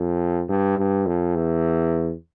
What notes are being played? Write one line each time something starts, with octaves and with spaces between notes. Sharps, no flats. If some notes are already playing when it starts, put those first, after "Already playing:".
Already playing: F2
G2
G2
F2
E2